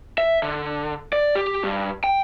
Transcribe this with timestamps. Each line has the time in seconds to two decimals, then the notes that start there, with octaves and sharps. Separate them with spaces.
0.18 E5
0.43 D3
1.13 D5
1.35 G4
1.64 G2
2.04 G5